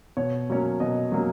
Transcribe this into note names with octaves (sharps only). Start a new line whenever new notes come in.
B2 C#5
F#3 A#3 C#4
B2 D#5
F#3 A#3 C#4